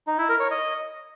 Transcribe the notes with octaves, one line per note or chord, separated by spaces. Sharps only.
D#4
E4
A#4
C#5
D#5